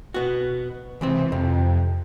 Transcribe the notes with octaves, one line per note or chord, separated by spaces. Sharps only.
B2 B3 F#4
C#2 C3 E3 C4
F2 C3